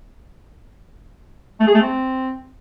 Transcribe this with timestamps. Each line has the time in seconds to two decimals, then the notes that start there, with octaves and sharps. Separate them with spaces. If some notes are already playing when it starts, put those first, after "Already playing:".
1.60 A3
1.67 G#4
1.74 A3
1.81 C4